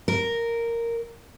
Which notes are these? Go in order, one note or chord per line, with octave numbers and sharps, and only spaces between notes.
A#4